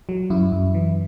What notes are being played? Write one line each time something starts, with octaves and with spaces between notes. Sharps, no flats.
F#3
F#2 E4
F#2
E3